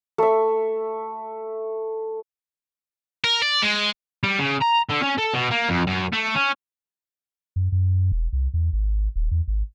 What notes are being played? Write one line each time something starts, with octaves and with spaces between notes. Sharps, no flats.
A3 E5
A#4
D5
G#3
G3
C#3
A#5
D3
C#4
A4
B2
A#3
F2
F#2
A3
C#4
F#2
F#2
E1
C2
E2
G#1
D#1
E2
G#1